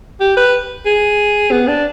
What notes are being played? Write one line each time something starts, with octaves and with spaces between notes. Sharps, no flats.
G4
B4
G#4
B3
D4